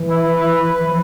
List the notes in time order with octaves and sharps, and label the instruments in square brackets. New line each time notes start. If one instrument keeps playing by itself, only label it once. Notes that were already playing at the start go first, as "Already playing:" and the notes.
Already playing: [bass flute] E3
[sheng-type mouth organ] E4
B4
B4
[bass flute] F3